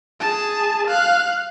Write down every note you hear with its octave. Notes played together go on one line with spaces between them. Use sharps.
G#4 A5
F5 F#6